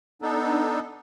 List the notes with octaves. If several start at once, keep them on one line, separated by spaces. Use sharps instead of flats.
B3 D4 D#4 A4